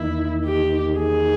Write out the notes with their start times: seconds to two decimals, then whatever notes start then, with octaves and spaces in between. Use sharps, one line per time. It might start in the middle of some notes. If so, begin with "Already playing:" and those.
Already playing: E2 D#3 A#3 D#4 E4
0.44 G4
0.98 G#4